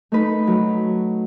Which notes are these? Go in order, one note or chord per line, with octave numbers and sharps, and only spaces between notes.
A3 D#4 B4
F#3